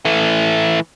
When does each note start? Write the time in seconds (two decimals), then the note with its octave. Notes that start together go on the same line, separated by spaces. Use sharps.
0.05 E3 A3